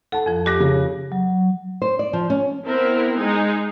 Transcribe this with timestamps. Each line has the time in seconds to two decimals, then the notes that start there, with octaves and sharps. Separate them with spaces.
0.12 A4 F#5 A5
0.26 F2 F3
0.46 G4 D6 F#6 A#6
0.60 C#3
1.12 F#3
1.82 C5
1.99 D5
2.13 F3
2.30 C#4
2.67 B3 C4 E4 A#4
3.16 G#3 D#4 G#4